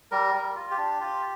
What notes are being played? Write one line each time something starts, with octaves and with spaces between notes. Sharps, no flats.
G3 A#4
G3
F4
G4
D4
F4